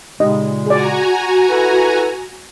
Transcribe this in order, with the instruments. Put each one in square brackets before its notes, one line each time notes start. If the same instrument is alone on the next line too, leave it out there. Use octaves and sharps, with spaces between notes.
[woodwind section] A#2 C#3 G#3 [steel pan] D#4 G4 D#5
[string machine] F#4 G#5 A#5 [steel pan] G#4 D5
[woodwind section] E4 A4 B4